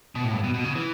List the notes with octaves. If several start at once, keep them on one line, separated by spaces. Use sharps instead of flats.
B2
A2
G2
B2
B2
C#3
E3